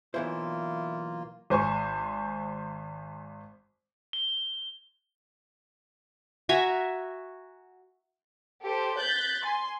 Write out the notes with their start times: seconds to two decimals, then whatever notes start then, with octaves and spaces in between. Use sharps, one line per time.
0.14 B1 E3 A#3 E4 F4 C5
1.50 G#1 C5 G#5 C#6
4.13 G7
6.49 F#4 E5 G#5 A#5
8.62 G4 A4 C5
8.98 F#6 G6 A6 B6
9.44 G#5 C6